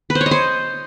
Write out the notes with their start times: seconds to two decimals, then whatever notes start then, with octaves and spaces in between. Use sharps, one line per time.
0.10 B4
0.15 C5
0.21 C#5
0.26 D#5
0.31 C5